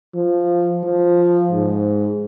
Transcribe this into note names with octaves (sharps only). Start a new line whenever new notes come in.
F3
F3
G#2